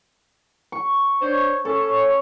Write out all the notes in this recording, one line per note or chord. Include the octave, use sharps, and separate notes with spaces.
C#6
D4 C5 C#5
C#4 A4 C#5